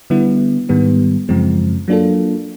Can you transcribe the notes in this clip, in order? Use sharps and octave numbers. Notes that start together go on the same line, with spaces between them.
D3 G3 B3 E4
G#2 D#3 G3 B3
F#2 C#3 F3 G#3 C4
F#3 A#3 D4 F4 A4